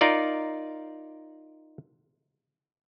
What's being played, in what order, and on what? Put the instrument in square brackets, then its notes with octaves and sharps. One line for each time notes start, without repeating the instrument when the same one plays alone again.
[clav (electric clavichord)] D#4 F4 A#4 D5